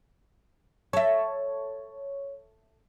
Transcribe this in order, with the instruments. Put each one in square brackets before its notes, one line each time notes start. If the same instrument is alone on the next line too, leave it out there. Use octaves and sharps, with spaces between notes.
[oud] A4 E5 [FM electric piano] C#5